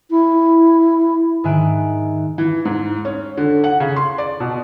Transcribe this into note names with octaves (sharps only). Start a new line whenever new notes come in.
E4
G#2 D#3 E5 G#5 F#6 D7
E3
G#2
C#4
D3
F#5
C#3
C6
D5
B2